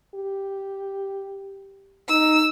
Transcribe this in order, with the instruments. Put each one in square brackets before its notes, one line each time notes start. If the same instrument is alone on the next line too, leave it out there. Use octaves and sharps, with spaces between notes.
[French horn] G4
[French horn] D#4 [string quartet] E6